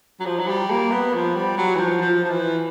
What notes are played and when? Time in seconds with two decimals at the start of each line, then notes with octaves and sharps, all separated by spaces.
0.20 F#3
0.26 F3
0.39 F#3
0.48 G3
0.70 A#3
0.92 B3
1.14 F3
1.35 G3
1.58 F#3
1.75 E3
1.79 F3
2.01 F3
2.24 F3
2.30 E3